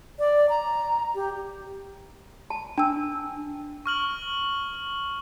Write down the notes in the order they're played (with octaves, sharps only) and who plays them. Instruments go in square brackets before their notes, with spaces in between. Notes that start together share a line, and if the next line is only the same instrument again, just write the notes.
[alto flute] D5
A#5
G4
[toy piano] A5
[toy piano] D4 A5 [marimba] G5 E6
[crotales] C#6 F6 F#7